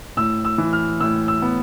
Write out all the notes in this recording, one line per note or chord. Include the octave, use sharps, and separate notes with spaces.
A2 E6
E6
E3
F6
A2 E6
E6
B3